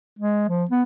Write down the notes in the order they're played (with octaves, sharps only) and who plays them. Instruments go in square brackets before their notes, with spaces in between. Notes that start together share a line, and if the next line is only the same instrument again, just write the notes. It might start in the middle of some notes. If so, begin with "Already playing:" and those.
[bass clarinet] G#3
F3
B3